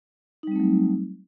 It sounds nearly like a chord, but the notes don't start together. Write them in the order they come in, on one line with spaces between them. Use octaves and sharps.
D#4 G3 C4 A3 F#3